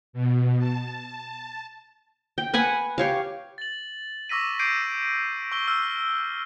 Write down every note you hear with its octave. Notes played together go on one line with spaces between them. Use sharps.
B2
A5
G5
B4 F#5 G#5 B5
G4 C#5 F5
A6 F#7
C#6 D6 E6 A#6 B6 D#7
D6 G6 C7 D7 D#7
C#6 E6 G7
E6 F6